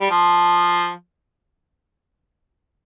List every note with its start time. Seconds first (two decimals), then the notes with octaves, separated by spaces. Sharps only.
0.01 G3
0.10 F3